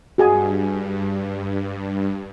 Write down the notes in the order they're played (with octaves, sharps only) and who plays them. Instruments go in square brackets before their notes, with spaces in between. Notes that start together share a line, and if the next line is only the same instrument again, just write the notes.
[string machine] G2 [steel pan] F#4 G#4 G#5